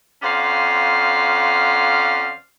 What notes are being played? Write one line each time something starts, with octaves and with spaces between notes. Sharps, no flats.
F2 C#4 C5 D5 F5 F#5